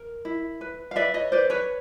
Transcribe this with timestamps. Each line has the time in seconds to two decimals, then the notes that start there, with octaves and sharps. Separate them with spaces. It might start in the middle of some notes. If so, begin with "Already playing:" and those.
Already playing: A#4
0.25 E4
0.61 B4
0.91 F5
0.96 B4 D5 E5
1.14 C#5 D#5
1.32 B4 C5 D5
1.50 B4 C#5